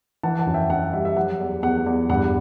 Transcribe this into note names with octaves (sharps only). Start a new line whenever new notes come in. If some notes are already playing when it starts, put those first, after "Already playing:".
E3 F#5 A5
F#5 A5
F#2
E5 G5
F#2 F#5
G3 E5
E5
F#3 F#5
E2
E2 F#5
E2
G2 F#5